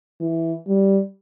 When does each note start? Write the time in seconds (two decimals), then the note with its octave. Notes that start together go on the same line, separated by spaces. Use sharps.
0.21 E3
0.67 G3